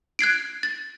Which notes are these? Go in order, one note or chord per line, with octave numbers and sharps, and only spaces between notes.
F#6 G#6 C7 D7
A6